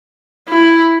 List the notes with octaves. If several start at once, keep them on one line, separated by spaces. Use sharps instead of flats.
E4